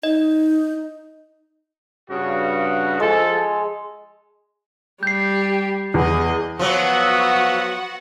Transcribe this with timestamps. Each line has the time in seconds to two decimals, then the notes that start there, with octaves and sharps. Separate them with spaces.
0.03 D#4 D#5
2.10 G2 C#3 F#4
3.00 F3 G#3 A4
5.03 G3 G4 G6 C7
5.94 E2 G#4 D#5
6.59 F3 F#3 B3 F#4 F#5